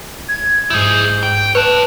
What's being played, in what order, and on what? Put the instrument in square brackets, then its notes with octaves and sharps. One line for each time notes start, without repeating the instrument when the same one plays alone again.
[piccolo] G#6
[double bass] G#2 [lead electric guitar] E4 G#4 [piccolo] G6
[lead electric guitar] G5
[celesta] B4 [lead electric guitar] C#5 A5 [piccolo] F#6